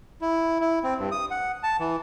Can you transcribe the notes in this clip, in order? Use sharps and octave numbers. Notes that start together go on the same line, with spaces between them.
E4
E4
C4
G2
D#6
F#5
A5
E3